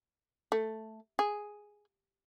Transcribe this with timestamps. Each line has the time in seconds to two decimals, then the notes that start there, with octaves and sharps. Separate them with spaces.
0.52 A3
1.19 G#4